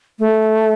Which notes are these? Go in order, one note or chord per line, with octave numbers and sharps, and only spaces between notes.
A3